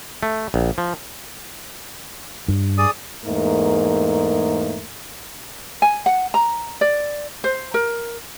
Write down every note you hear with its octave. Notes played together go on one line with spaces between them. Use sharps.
A3
A#1
F3
G2
G#4 D5 D#6
E2 G#2 A3 A#3 A#4
G#5
F#5
A#5
D5
C5
A#4